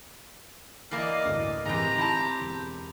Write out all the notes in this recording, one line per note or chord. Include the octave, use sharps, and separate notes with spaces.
E3 A#3 D5 D#5 F5 C7
D2 A2
A1 D#3 E3 G#3 C4 G4 A#5
E4 A5 C6 G6
E1